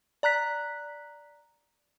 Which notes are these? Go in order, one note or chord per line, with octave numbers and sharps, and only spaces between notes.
D5 A#5 F#6 B6